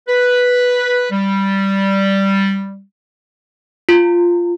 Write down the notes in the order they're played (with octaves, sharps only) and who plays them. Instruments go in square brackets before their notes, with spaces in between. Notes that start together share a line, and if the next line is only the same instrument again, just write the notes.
[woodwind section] B4
G3
[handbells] F4